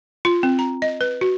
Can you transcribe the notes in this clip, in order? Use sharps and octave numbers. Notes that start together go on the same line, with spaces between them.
F4
C4
A#5
D#5
B4
F#4